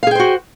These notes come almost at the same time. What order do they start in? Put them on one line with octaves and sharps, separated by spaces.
F5 G#4 G5 C5 F#4